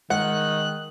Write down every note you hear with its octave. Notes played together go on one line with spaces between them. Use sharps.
D#3 G#3 A#4 F#5 F#6